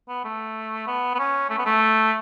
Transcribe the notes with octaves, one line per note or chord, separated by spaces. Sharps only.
B3
A3
B3
B3
C#4
A3
B3
A3